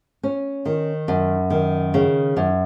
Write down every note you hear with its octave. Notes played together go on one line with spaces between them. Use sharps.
C#4
D#3
F#2
D#3
C#3
F#2